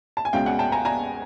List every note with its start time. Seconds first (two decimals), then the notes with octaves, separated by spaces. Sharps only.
0.17 A5
0.25 G#5
0.33 C#2 B2 G#3 C#4 F5 G5
0.46 F#5 G#5
0.59 G5 A5
0.72 G#5 A#5
0.85 G#5 A#5